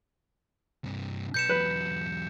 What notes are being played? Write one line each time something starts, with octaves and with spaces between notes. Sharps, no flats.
G2 C3
B1 B4 G6 C#7 E7
E2 F#3 B4